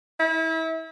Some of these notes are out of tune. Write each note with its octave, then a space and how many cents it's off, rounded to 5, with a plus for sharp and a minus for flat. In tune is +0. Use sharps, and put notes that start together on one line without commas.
E4 -30